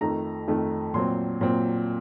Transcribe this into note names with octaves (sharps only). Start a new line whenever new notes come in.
F2 D#3 A3 A#5
F2 D#3 A3
A#2 F#3 C4 C6
A#2 F#3 C4